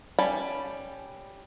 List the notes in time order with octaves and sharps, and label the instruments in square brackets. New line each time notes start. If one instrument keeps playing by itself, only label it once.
[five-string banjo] G3 C#4 A5 B5